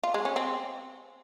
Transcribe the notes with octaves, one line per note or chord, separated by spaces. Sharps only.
F4
G#3
C#4
C4